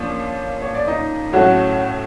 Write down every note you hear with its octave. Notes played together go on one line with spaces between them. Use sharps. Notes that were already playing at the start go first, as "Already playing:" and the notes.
Already playing: A#2 F3 C#4 D4
C#5
D5
D#4 D#5
A2 F#3 A3 C#4 F#4 F#5